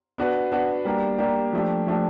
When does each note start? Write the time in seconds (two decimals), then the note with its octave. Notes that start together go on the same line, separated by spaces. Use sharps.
0.18 B3 D4 F#4 B4
0.52 B3 D4 F#4 B4
0.85 G3 A#3 D4 G4
1.18 G3 A#3 D4 G4
1.53 F3 A3 D4 G4
1.87 F3 A3 D4 G4